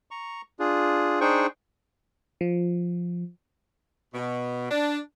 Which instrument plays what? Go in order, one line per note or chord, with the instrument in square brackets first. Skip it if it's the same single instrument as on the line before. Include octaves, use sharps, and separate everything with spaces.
[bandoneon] A#5 C#6
D4 F4 G#4
D4 D#4 G#4 C5 G5 C#6
[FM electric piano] F3
[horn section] B2
D4